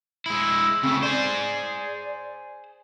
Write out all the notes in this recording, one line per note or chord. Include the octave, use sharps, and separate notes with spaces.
G#3 E4 E6
C#3 A3 C4
G#4 C5 D5